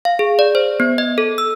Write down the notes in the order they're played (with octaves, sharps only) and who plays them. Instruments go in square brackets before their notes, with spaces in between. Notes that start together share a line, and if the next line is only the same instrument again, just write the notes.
[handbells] F5
G#4
D5
C5
B3
D#5
A4
E6